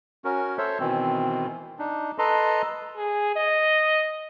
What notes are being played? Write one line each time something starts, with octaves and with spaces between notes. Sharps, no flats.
C#4 F#4 A#4
A4 C5 C#5 E5
B2 D#3 E3 C4
D4 D#4
A4 B4 D#5 A5 A#5 C6
G#4
D#5